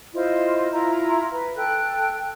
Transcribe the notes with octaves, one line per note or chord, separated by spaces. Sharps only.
E4 F4 C5 D#5
E4 F4 A#5
B4
A4 G5 F#6